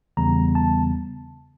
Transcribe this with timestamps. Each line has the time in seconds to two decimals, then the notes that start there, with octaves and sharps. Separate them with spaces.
0.17 E2 C#3 E3 G3 B3 A#5
0.55 A5